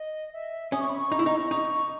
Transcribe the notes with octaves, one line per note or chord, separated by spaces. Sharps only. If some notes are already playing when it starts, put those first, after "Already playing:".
Already playing: D#5
E5
C#4 D#6
C#6
B5
C#6
D#4
E4
D#4
D#4 C#6